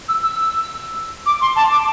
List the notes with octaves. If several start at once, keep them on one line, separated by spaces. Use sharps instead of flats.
E6
E6
D6
C6
A5
D6